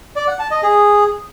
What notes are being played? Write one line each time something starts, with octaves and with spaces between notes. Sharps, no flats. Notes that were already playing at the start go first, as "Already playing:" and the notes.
D5
F#5
A5
D#5
G#4